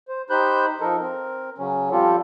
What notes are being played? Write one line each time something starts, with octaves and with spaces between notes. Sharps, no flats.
C5
D#4 G4 C5 B5 F#6 G6
F3 D#4 A4 A#4
C4 A#4
C#3 F#3 C#4
F3 G3 C4 F4 G4 A4